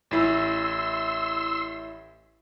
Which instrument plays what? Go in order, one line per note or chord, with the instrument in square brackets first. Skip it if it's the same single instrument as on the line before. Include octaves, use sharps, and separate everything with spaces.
[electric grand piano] A1 E4 [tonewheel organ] C6 E6